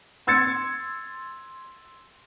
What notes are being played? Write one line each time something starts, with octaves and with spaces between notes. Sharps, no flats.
C6 E6 G#6 A6 C#7